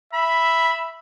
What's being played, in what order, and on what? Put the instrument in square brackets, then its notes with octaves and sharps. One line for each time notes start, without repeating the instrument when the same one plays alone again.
[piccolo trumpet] E5 [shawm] B5